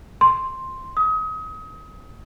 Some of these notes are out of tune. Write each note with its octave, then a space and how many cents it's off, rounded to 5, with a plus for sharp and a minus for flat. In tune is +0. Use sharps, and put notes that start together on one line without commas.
C6 +5
D#6 +30